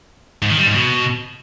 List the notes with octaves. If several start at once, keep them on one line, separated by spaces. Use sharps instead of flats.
G#2
D#3
G3
G#2
B2